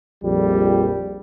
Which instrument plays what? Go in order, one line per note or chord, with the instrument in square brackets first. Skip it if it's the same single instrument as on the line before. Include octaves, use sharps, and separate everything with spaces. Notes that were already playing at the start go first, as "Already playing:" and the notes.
[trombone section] A#1 F2 G3